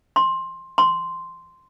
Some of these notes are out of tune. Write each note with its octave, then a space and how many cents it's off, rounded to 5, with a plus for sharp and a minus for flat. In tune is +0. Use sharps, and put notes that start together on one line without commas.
C6 +15
C6 -5